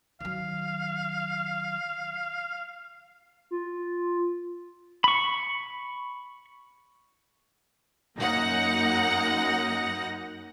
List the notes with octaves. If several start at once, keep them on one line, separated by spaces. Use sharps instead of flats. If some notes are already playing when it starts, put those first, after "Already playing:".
D#3 F#3 F5
F4
B5 C#6
F#2 A#3 D#4 F#5 A#6